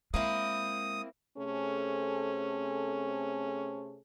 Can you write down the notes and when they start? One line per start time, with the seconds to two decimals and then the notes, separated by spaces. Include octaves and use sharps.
0.14 G#3 A#3 C4 E4 D#6
1.38 C3 A3 C4 C#4 G#4 A4